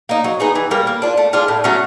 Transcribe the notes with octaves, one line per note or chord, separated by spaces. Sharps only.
A#3 D#4
F#3
B3 D#4 G#4
E3
G3 A#3
A#3
D4 F4
A3
D4 F4 G#4
A2
F#3 A3 C#4